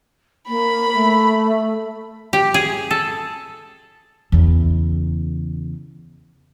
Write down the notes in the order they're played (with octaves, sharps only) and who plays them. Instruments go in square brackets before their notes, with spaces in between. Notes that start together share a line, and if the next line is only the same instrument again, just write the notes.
[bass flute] A#3 [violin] B5
[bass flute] A3
[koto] G4
G#4
A4
[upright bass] E2 C#3